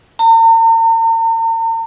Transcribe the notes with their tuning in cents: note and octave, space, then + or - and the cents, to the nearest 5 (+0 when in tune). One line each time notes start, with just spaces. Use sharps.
A#5 -45